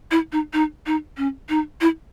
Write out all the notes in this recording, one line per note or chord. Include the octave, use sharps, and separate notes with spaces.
E4
D#4
D#4
D#4
C#4
D#4
E4